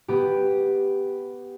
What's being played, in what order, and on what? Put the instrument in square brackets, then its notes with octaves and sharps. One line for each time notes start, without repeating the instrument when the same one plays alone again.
[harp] B3 G4